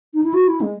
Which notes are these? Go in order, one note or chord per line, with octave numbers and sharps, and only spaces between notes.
D#4
E4
F#4
E4
G#3